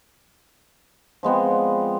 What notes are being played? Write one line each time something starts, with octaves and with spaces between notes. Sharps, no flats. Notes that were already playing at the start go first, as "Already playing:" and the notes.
F3 G#3 B3 C4
D5